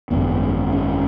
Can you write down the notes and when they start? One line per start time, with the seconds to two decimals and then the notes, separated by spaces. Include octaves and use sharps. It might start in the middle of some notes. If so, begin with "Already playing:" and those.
0.10 G#1 F#2 C#3 B3
0.72 C#4